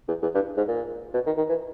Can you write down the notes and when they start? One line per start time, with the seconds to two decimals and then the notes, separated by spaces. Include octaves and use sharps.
0.08 E2
0.22 E2
0.35 G2
0.57 G#2
0.68 A#2
1.14 B2
1.26 D#3
1.37 D#3
1.49 E3